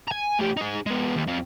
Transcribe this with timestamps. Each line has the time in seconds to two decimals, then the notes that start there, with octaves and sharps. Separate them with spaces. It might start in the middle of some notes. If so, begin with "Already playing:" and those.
0.08 G#5 A#5
0.39 A2 G4
0.57 D#4 G#4
0.86 G#3 B3
1.15 D#2
1.27 F2 C4